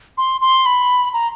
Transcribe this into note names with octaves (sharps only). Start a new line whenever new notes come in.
C6
C6
B5
A#5